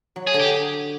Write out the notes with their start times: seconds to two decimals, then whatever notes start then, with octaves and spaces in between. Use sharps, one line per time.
0.16 F#3
0.27 G#4
0.34 D3
0.40 G4